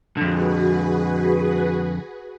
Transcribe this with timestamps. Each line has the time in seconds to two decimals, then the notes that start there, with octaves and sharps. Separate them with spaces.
0.17 F2 D3 F#4 G#4 B4